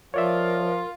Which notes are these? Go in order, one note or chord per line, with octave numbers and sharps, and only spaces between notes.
F3 F4 A#4 C#5 D5 E5